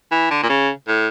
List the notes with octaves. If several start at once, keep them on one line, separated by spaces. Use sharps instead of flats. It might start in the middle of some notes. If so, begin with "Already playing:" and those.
E3
D3
A#2
C#3
A2